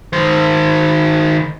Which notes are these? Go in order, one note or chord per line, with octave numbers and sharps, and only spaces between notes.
D#3 C5